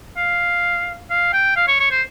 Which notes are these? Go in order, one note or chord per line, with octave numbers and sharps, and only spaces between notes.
F5
F5
G5
F5
C#5
C#5
C5